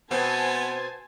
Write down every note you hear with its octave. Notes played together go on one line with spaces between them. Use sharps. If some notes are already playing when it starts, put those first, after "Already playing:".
B2 B3 C4 C5 G#5 A5